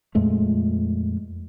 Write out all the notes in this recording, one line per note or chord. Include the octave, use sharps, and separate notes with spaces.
F2 A#2 G#3 A3